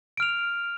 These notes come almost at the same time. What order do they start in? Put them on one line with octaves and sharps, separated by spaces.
D7 F6 F7